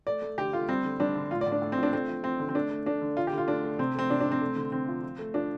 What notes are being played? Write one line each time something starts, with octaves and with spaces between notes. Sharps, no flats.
A3 D5
A3
D3 G4
A3 F4
G3 C4
D3
G3 D4
D3
A2 F4
D5
A2
D4
A2
C4
F3
D4
A3 C4
F3
F3 C4
D3
C4
A3 D4
A3
A3 D4
D3
D3 F4
G4
D3 F4
A3 D4
A3
C3 C4
A3 C4
C3 D4
D4
C3
C4
A3
D3
D3 C4
F3
F3
A3
F3 D4